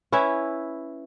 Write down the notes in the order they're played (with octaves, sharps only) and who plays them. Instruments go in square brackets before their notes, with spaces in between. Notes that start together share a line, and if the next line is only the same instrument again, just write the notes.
[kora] C#4 E4 B4 E5